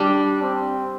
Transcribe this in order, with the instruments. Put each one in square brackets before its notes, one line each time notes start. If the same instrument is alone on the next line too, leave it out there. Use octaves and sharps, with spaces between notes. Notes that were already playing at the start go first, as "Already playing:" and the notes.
Already playing: [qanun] G3 [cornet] D4
[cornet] C4